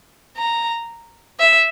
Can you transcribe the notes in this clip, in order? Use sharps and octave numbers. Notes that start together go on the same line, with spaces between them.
A#5
E5